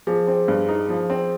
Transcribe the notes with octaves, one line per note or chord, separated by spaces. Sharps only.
F3 G#4
C4
G2
D#4
F3
C4